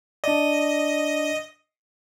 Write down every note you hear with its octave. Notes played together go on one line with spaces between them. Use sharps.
D4 D5 D#5